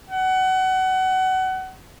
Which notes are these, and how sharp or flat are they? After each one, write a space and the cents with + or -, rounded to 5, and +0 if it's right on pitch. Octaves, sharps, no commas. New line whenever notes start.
F#5 +25